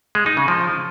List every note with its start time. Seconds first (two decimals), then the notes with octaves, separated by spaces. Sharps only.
0.15 G#3
0.26 D#4
0.37 C#3
0.48 F3